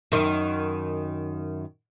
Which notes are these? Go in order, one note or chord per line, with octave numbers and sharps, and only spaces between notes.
F#2 D#3